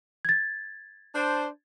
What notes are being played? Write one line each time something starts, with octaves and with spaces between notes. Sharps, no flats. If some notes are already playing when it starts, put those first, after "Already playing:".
G#6 A6
D4 C5